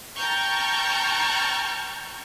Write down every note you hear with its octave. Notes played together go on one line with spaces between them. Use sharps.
G5 A5 A#5 C#6 F6 G6